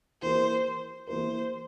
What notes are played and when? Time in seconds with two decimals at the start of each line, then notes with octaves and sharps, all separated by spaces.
0.22 E3 A#3 E4 G4 A#4 C5
1.07 E3 A#3 E4 G4 A#4 C5